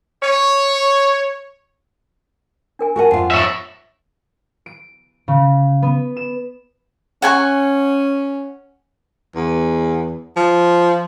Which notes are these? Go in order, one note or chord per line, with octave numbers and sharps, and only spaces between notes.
C#5
D4 A#4 G#5
F#4 A#4 F#5 G#5 A5
F2 F4 F#5
C#5 E5
D7
C#3
B3
E7
C#4 F#5 G#5 C#6
E2
F3